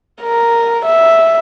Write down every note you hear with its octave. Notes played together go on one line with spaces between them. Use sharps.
A#4
E5